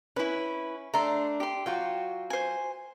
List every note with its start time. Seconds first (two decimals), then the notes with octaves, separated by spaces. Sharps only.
0.16 C#4 E4 B4
0.94 A3 D4 A#5 C6
1.40 G4 C6
1.66 F#3 F4 F#4 G5
2.30 C5 G#5